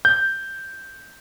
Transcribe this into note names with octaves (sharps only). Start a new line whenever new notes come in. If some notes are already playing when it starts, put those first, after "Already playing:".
G6